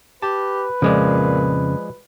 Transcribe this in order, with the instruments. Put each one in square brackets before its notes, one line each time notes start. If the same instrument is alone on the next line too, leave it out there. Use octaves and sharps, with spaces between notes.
[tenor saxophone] G4 [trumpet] B4 [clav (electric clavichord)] A5
[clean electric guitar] F2 C#3 [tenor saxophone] A#2 [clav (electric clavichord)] F3 G#3 D5